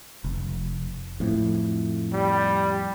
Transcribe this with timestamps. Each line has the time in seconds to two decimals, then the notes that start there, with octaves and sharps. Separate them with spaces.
0.24 F1
1.20 F2 A2
2.13 G3